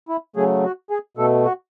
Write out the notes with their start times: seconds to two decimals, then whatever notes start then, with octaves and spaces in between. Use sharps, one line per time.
0.09 E4
0.36 C#3 F#3 A3 G#4
0.64 F#4
0.90 G#4
1.17 B2 A3 A4
1.45 F#4